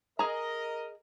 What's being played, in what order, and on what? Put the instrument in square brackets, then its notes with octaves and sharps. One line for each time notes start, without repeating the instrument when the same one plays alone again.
[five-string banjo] G#4 A#5 [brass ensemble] A#4 D#5